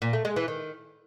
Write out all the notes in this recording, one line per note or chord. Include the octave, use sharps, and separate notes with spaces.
A#2
A3
G#3
E3
D#3